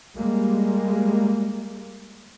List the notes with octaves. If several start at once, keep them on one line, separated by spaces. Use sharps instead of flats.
G3 G#3 A#3